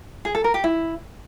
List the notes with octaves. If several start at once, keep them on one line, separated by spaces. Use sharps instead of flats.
G#4
A4
A#4
G4
E4